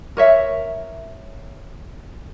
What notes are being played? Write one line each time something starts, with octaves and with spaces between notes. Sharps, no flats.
A#4 C#5 E5